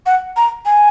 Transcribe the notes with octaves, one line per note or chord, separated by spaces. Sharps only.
F#5
A#5
G#5